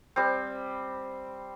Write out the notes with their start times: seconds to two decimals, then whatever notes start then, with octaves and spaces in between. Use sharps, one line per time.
0.16 G3 C4